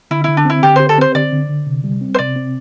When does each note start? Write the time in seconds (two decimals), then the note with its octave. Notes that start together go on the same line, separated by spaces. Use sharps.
0.11 D3 E4
0.24 D3 E4
0.37 D4
0.45 C4 E4
0.63 D3 G4
0.76 G4 C5
0.89 A4
0.98 C4 C5
1.15 D3 D5
1.33 D3
1.49 D3
1.67 C3
1.84 G3
2.01 C4
2.14 C5
2.19 C3 D5
2.36 C4